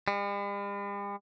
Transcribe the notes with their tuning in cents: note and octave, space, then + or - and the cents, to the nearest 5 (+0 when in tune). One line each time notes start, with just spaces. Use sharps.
G3 +45